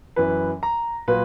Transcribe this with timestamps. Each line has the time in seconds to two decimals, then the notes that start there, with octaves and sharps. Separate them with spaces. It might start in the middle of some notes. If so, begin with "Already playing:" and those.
0.16 F#2 E3 B4
0.63 A#5
1.08 A#2 F#3 B4